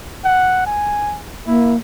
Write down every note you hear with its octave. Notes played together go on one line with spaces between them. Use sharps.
F#5
G#5
A#3 E4